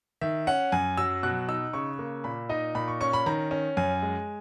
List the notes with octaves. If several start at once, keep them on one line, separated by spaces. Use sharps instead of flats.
D#3 E5
C#4 F#5
F#2 G#5
F#3 E6
B2 F#6
D#4 E6
C#3 C#6
A#3
A#2 B5
D#4 D#5
A#2 B5
C#6
C#4 C#6
B5
D#3 A#5
C#4
F#2 G#5
G#3